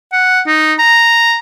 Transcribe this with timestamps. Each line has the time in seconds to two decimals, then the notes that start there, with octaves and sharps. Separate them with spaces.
0.13 F#5
0.47 D#4
0.79 A#5